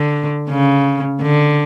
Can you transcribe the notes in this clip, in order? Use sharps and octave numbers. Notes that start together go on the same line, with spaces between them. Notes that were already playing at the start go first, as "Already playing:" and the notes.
Already playing: D3
C#3
D3